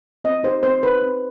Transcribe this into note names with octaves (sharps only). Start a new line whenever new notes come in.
C4 D#5
D#4 G4 C5
C4 C5
D#4 G4 B4
C4